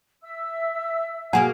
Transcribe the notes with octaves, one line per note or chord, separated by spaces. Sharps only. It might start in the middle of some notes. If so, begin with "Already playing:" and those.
E5 E6
B2 A#3 G#4 F#5 G#5